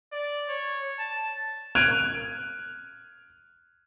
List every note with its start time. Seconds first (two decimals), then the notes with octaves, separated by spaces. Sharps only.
0.12 D5
0.49 C#5
0.99 A5
1.75 F6 F#6 G#6 D7 D#7 F7